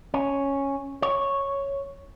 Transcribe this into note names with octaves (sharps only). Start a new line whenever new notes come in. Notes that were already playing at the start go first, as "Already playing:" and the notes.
C#4
C#5